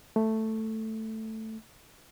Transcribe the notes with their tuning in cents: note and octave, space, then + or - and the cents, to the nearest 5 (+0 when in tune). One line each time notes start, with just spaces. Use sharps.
A3 +5